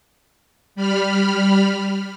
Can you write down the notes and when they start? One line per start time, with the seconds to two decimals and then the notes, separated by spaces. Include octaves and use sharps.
0.75 G3 B5 F6